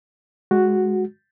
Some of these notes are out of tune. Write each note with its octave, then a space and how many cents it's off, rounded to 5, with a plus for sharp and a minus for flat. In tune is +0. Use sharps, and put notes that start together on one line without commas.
G#3 +0 F#4 +0